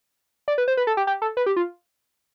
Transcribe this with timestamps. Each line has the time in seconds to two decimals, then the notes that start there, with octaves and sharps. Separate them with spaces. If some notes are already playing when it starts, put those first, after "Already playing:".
0.48 D5
0.58 B4
0.68 C5
0.77 B4
0.87 A4
0.97 G4
1.07 G4
1.22 A4
1.37 B4
1.46 G4
1.56 F4